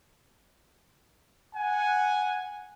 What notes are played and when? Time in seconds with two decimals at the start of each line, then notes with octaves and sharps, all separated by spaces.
1.55 F#5 G#5